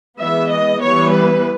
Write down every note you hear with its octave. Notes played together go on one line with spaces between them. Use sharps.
E3 G#3 B3 E5
D#5
E3 G3 B3 C#5
B4